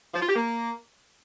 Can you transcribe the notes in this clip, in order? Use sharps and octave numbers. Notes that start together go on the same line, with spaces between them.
F3
F4
G4
A#3